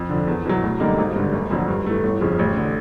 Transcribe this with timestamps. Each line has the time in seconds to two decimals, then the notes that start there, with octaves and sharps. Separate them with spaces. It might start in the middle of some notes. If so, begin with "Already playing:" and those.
Already playing: F2
0.10 D3 F3
0.27 E2
0.46 B2 F#3
0.63 D2
0.80 D3 G3 A#3 D#4
0.98 G#1
1.16 G2 D3
1.33 F#1
1.51 F2 D3 F#3
1.68 G2
1.86 E3 A3
2.03 G1
2.21 F2 C#3 F3
2.39 A1
2.57 D3